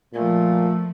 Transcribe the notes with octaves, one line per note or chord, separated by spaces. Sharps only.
A#2 F3 A3